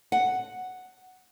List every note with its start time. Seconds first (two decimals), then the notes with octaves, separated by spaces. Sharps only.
0.12 F#5